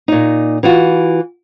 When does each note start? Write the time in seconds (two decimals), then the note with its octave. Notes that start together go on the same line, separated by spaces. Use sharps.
0.08 A#2 D#4
0.63 E3 F4 F#4